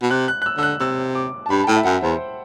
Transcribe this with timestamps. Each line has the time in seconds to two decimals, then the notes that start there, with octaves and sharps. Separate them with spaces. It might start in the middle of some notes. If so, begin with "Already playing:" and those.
0.02 B2
0.11 C3 F#6
0.28 F#6
0.42 F#6
0.46 E6
0.57 D3 E6
0.63 F#6
0.80 C3 E6
1.15 D6
1.46 A5
1.50 G2 B5
1.64 A5
1.67 A2 G5
1.76 E5
1.85 F#2 F#5
2.02 E2 C5